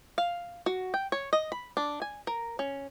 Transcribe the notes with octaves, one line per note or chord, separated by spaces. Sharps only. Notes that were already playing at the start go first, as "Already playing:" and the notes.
F5
F#4
G5
C#5
D#5
B5
D4
G#5
A#4
C#4